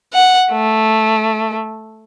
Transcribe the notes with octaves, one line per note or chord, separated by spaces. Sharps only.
F#5
A3